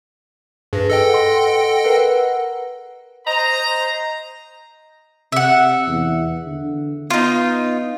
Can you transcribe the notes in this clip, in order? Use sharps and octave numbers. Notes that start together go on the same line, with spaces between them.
G2 G#4 B4 A#6
A4 D#5 G5
F#5 C6
A#4 B4 F#5
C5 D#5 A#5
C3 E5 F#5
E2
D3
B3 D#4 F4